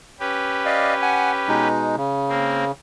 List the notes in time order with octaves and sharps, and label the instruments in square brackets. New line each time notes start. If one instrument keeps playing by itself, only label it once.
[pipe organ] C#4 G4 B4
[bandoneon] D5 D#5 F5
F#5 G#5
B2 G#3 D#4
C#3
[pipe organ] A#3 C4